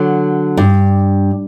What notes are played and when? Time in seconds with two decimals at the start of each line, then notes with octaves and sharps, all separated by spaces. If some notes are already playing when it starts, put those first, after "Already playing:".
Already playing: D3 F#3
0.57 G2